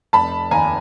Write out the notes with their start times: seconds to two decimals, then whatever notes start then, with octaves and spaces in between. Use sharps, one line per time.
0.13 F1 A5 B5
0.51 D#2 G#5 A#5